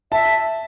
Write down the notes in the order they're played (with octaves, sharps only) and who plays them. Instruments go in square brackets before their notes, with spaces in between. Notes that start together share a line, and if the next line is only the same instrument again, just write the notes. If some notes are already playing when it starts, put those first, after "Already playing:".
[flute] E5 [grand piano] A5